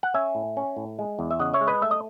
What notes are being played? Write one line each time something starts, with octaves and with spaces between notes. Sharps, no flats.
F#5
C#4 E5 G#5
A2
C#4
A2
G#3
E2
E5
C#3 D#5 F#5
C#5 E5
G#3
B4 D#5
A3 E5
D#5